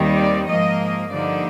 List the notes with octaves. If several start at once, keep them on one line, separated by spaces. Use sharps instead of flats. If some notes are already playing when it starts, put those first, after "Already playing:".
Already playing: D#2 D#3 G3 C4 D#4
D5
G#2 F3 A#3 D#5
G2 D3 F3 A#3 D#4 D5